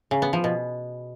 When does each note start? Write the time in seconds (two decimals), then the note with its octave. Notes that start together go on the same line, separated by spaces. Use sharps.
0.11 C#3
0.22 B3
0.33 F3
0.44 B2